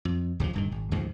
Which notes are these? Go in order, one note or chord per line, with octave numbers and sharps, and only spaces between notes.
F2
D2 C#3 E3 F3
D1 G2 D#3
G#1
D2 G#2 C#3 F3